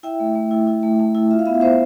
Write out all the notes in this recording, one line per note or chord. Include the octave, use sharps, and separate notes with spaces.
E4 E5 G5
A3
A3
E4
E4
A3
A3
E4
F4 E5
F5
B3 E5
F5
B3 C5 E5